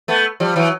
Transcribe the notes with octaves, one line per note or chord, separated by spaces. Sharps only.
A3 B3
F3 G3
E3 F#3